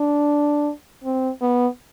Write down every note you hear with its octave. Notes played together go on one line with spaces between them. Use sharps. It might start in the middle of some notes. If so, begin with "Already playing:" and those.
Already playing: D4
C4
B3